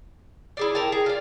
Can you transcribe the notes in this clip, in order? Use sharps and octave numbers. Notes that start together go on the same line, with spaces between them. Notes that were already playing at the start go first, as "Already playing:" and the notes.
E4 G#4 D5
A#4 G5 A5
G#4
F4 D5